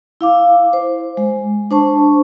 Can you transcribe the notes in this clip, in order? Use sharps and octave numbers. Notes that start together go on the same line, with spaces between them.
E4 F5 D6
C5
G#3
D4 C5 A5 C#6